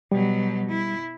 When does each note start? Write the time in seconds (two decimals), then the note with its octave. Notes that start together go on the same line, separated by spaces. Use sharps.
0.12 B2 F#3 G3
0.70 E4